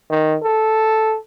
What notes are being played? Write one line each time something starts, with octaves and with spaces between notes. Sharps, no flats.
D#3
A4